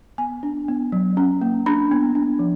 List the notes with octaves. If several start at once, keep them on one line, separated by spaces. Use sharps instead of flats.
B3 G#5
D4
B3
F#3
C#4
A#3
D4 B5
B3
D4
F3